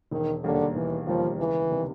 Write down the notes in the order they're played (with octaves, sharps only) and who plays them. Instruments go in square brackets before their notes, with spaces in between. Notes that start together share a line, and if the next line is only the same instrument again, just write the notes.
[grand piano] E1 [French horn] D#3
[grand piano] D#2 D#3 G3 A#3 [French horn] D3
[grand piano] E1 [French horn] E3
[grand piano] D#2 D#3 G3 A#3 [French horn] F3
[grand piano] C#2 [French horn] E3
[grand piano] C3 D#3 G3